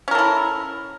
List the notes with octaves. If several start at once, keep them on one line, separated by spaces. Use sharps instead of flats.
C#4 E4 A4 A#4